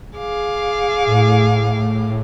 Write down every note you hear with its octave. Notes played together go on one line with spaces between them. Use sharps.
G#4 F5 D6
A2